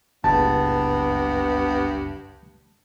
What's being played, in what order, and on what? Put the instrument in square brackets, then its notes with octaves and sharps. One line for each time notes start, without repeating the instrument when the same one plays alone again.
[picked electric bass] F#1 C#2 [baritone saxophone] G2 [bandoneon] B3 [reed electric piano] A5